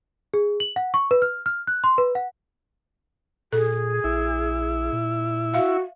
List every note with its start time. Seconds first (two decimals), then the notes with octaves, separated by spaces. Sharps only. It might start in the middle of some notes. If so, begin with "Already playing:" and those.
0.34 G#4
0.60 F#7
0.76 F#5
0.94 C#6
1.11 B4
1.22 F6
1.46 F6
1.67 F#6
1.84 C6
1.98 B4
2.15 F#5
3.53 A#2 G#4 A4
4.04 A#1 E4
4.92 A#2
5.54 F#4 E5 F5